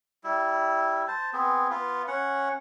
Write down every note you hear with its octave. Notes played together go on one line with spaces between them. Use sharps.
G3 E4
C5 A5
B3 C4 G#4
B3 F4
C#4 F#5